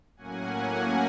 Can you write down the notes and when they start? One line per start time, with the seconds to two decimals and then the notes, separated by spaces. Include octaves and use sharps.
0.17 A2 F#3 A#3 C#4 F#5 G#5
0.57 F#5 G#5